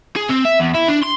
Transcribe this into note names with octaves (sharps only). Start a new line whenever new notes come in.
G#4
C4
E5
E2
E4
D4
C6